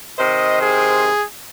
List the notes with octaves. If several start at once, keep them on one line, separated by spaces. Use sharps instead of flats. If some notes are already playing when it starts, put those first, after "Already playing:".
C3 D#3 C5 D#5
G#4